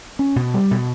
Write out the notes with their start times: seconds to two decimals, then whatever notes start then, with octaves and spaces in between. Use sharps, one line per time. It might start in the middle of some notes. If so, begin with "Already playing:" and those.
0.19 C#4
0.36 B2
0.54 G3
0.71 B2